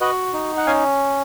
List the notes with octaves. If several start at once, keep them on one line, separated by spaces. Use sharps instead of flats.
F#4 B4 D#5
D#4
F#5
C#4 F5 G#5